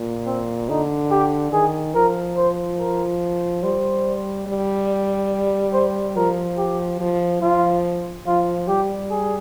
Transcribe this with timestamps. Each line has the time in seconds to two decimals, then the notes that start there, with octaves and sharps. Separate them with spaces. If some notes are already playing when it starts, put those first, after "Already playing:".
Already playing: A#2
0.26 C4
0.69 D3 D#4
1.11 G4
1.52 D#3 G#4
1.94 F3 A#4
2.36 C5
2.79 A#4
3.63 G3 C5
4.47 G3
5.73 C5
6.16 F3 A#4
6.57 G4
7.00 F3
7.42 F3 F4
8.26 F3 F4
8.68 G3 G4
9.10 G#4